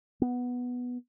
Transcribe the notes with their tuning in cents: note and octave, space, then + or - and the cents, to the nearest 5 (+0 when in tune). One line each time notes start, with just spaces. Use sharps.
B3 +0